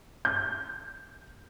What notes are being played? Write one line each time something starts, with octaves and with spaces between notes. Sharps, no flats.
G6